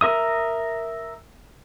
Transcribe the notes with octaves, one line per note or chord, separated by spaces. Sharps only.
A#4 E5 D#6